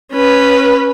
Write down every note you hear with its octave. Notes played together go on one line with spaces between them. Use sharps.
C#4 B4